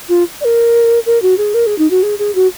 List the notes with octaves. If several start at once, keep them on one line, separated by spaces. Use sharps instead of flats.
F4
D5
A#4
A#4
F#4
G#4
A#4
G#4
D#4
F#4
G#4
G#4
F#4